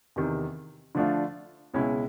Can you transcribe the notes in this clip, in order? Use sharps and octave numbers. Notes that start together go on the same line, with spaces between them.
E2 C3 D#3
D3 F3 A3 D4 F4
C#2 B2 G#3 C#4 E4